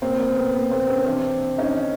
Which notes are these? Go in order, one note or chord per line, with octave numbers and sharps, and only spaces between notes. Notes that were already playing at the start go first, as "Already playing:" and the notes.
B2 A#3 C4
A#3 C4
B3
A#3
A#3 C4
B3 C#4
C3 E3 C4 D4
C#4 D#4